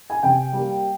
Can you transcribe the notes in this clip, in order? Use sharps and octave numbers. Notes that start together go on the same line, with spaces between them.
G#5
C3 G5
G3 A#3